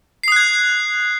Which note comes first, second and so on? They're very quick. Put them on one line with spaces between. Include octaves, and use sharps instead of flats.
C7 D#6 F#6 G#6